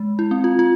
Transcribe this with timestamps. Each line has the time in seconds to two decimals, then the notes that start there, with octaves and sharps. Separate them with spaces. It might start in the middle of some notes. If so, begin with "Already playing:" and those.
Already playing: G#3
0.19 E4
0.31 C4
0.44 F4
0.59 F4